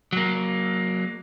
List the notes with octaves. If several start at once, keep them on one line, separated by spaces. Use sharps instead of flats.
F#3 A#3